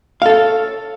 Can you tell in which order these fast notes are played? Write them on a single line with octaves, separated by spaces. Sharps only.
F5 A4 C#5